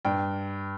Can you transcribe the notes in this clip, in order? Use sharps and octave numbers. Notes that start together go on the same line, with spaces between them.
G2 G5